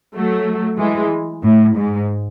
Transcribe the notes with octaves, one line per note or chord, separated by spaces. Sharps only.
F#3 A3
E3 G#3
A2
G#2